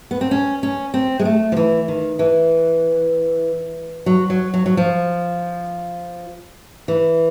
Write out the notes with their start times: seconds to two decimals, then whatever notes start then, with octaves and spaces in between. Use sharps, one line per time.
0.11 B3
0.21 C4
0.31 C#4
0.63 C#4
0.94 C4
1.19 G#3
1.25 A3
1.52 F3
1.57 E3
1.88 D#3
2.19 E3
4.06 F#3
4.30 F#3
4.54 F#3
4.66 F#3
4.77 F3
6.88 E3